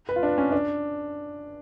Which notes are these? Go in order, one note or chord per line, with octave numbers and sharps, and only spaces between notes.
B4
F4
D4
C#4
D4